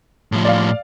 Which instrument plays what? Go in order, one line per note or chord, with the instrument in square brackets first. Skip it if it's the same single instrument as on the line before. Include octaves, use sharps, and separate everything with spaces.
[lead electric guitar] A2 F3
[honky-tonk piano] D5 F5